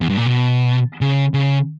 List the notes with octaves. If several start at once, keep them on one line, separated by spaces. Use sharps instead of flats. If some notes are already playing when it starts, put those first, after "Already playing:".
E2
G2
A#2
B2
C#3
C#3